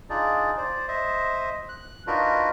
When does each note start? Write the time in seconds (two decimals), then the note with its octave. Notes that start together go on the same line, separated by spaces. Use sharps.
0.10 D4 D#4 F4 G#4 D5
0.57 C5 D5
0.88 C5 D#5 E5
1.69 F#6
2.07 D4 D#4 F4 F#4 A#4 B4